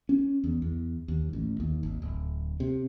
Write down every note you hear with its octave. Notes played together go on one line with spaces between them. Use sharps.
C#4
E2
E2
D#2
A1
D#2
G#1
D1
C3